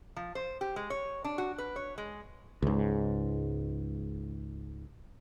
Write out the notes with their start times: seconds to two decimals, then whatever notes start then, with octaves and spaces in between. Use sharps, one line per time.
0.16 F3
0.35 C5
0.61 G4
0.76 G#3
0.90 C#5
1.24 D4
1.38 F#4
1.58 B4
1.76 C#5
1.98 G#3
2.62 C#2 G#2